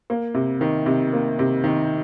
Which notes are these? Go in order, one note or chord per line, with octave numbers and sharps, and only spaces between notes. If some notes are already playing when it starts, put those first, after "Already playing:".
A#3
C3
D#3
C3
A#3
C3
D#3